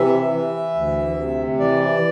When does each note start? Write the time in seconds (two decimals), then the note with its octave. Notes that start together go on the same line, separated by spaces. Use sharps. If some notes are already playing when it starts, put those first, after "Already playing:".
Already playing: C3 E3 E5
0.33 E3
0.75 D2
1.17 C3
1.60 E3 D5